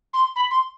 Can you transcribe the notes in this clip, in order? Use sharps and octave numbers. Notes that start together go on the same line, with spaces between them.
C6
B5
C6